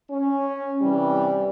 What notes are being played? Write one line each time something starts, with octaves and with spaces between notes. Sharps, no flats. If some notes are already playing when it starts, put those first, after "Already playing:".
C#4
C3 E3 G3